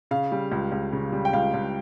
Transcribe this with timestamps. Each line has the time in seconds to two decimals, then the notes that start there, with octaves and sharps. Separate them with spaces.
0.11 C#3 F5
0.32 G3
0.52 C#2
0.72 C#2
0.93 C#3
1.12 G3
1.25 G5
1.33 C#2 F5
1.54 C#2